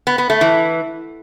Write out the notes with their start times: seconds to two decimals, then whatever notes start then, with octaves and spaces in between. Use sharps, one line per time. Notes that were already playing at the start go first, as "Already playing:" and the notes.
0.07 B3
0.18 B3
0.30 A3
0.41 E3